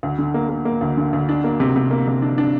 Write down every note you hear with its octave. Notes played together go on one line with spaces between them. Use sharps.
D2
D3
A#3
A#3
A#3
D2
D3
D2
D4
A#3
C3
C3
A#3
C3
D4
D4